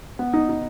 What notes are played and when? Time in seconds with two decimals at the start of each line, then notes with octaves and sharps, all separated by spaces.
0.19 B3
0.33 D#4
0.49 D#4